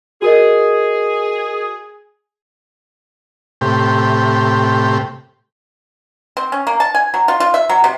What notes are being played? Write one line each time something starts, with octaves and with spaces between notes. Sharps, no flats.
F#4 G#4 A#4 D#5
A2 C3 G4
C4
C#4
A#3
A5
G#5
F#3
F4
F4
E5
F#3
C3